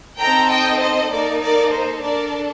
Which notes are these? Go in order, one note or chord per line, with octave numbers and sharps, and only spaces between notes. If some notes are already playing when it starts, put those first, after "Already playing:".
C4 D#4 A4 G5 A#5
D#5 G5
C5 D#5
A#3 D#4 A4 A#4 D5
A#4 D5
C5
D4 A4 A#4 D5